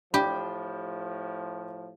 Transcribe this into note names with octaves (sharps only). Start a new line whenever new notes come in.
A2 F3 D4 G4 G5 B5